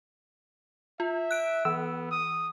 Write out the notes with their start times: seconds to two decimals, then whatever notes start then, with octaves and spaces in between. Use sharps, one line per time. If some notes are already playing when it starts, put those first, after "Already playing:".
1.00 F4 E5
1.31 F#6 D7
1.65 E3 B3 E6
2.11 D#6